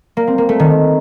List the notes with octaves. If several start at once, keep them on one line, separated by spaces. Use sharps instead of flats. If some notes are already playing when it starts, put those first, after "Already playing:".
A#3
C4
A#3
A3
D#3